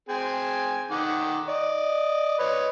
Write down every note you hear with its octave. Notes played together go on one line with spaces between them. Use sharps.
C4 G#4 G#5
D#3 F#5 D6
D5 D#5
B4 C#5 D#5